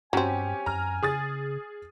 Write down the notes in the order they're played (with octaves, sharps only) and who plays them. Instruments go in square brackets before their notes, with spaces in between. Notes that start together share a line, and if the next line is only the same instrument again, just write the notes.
[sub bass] G2 [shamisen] F#3 C4 [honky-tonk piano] C#4 G4 [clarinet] G#5
[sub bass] F#2 [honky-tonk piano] A#5 F6
[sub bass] C#3 [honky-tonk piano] G#4 D#6 A6